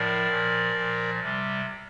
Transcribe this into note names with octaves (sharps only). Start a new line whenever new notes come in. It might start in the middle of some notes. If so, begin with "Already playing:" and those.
Already playing: A2 F3 A#4 D5
A#2 F3
A#2 F3
C3 G3